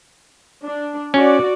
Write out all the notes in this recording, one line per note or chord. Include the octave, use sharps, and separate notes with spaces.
D4
C#4 F#4 D5